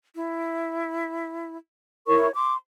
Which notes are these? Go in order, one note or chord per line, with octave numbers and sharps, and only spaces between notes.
E4
E4 A#4 C#5 C#6
C6 D6